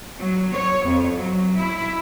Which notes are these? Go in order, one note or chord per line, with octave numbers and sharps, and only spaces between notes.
F#3
C#5
F2
F#3
E4